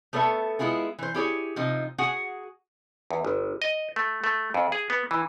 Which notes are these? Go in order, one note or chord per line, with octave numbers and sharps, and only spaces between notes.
A3 B3 A4 C#5 E5
G#3 B3 E4 F4 G#4
E3 C5
E4 G4 G#4 C#5
C3 F3 D#4
F#4 G#4 F#5 G#5
E2
G1
D#5
A3
A3
F2
G#4
B3
E3